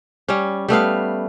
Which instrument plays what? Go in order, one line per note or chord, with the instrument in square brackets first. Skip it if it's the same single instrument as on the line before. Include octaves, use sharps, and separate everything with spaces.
[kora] G3 C#4
G3 A3 B3 F5